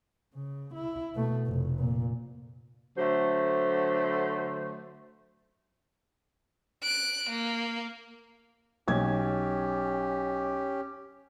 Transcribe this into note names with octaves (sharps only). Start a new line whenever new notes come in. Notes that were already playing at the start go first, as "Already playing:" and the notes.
C#3
E4
B2 A3
F1
A#2
D3 F#3 A3 C5
F#6 D7
A#3
B1 C#4 G4 G#6